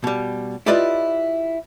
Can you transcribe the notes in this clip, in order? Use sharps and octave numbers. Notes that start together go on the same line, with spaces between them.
B2 G3
E4 F4 G4 B4 D5 D#5